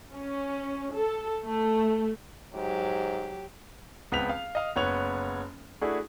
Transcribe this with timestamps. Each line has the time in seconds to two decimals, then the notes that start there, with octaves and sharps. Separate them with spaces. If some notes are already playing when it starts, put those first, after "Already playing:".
0.12 C#4
0.93 A4
1.44 A3
2.54 G#2 F#3 G4
4.12 C#2 B3 C4 B6 F7
4.29 F5
4.55 D#5 F5
4.76 F#1 B3 C#5 F7
5.81 A3 D4 E4 F#4 G#4